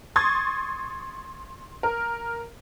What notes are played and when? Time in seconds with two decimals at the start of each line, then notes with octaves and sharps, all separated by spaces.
0.16 C6 C#6 D#6 G#6 A6
1.83 A#4